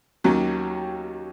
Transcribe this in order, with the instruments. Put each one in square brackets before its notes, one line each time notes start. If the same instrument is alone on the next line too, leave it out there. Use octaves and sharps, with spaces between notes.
[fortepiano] D#2 D#3 F#3 C#4